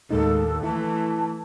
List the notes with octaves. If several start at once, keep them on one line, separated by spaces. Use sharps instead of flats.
D#2 A2 G#3 D#4 A4
E3 A3 E4 A5